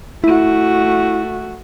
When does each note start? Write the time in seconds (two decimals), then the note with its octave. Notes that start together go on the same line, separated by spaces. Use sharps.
0.24 A3 E4 F#4